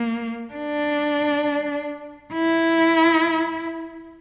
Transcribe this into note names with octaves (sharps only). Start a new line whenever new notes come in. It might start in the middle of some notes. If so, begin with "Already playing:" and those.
Already playing: A#3
D4
E4